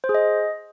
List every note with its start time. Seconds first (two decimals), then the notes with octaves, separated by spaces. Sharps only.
0.04 C5
0.09 G#4
0.14 D#5